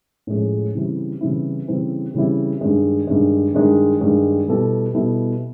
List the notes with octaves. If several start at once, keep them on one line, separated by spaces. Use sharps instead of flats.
A2 F3 G#3 C#4
C#3 E3 G3 C4 E4
C#3 E3 G3 C4 E4
C#3 E3 G3 C4 E4
C#3 E3 G3 C4 E4
G2 D#3 G#3
G2 D#3 G#3
G2 D#3 G#3
G2 D#3 G#3
B2 G3 B3 E4 A4
B2 G3 B3 E4 A4